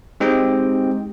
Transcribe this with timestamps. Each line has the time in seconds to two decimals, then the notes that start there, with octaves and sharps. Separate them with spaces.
0.20 G#3 C4 D#4 G4 D#5 G5